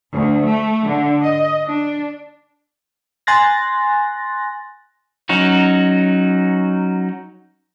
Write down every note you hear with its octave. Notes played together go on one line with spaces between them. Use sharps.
D2
A3
D3
D#5
D4
G#5 C6 F#6 A6 A#6
F#3 C#4 D#4 F#4